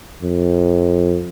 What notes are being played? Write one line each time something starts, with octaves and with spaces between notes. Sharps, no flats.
F2